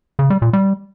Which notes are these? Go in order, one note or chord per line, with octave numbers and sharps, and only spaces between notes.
C#3
G3
A#2
G3